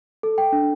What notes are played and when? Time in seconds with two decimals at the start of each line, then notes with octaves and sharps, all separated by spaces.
0.23 A4
0.38 G5
0.53 D4